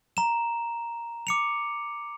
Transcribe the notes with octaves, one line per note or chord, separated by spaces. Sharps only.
A#5 E7
D6 C#7 F7